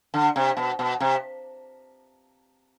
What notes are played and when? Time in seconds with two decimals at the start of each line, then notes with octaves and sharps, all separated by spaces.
0.14 D3
0.36 C3
0.57 B2
0.79 B2
1.00 C3